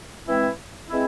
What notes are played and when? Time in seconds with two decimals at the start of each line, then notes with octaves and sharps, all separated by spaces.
0.25 E3 G#3 C4 E4
0.89 E3 G#3 C4 E4